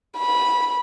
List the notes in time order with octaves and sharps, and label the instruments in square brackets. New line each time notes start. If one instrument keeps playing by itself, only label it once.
[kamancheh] B5